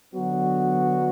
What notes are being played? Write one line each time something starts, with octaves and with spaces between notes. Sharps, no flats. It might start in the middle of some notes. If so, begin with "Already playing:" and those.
D3 F#3 B3 F#4